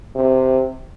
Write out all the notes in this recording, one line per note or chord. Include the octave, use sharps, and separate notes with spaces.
C3